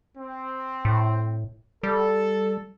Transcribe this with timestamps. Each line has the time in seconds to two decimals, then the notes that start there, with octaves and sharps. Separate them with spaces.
0.18 C4
0.85 A2
1.83 G3 A4